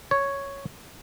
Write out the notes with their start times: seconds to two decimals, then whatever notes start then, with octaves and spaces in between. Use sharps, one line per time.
0.11 C#5